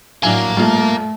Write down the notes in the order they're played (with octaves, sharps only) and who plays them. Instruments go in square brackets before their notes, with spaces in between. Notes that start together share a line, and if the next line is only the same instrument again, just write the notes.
[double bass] A2 F#3 [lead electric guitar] A#3 [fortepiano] D4 E4 G#5
[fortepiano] G2 A#2 [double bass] A3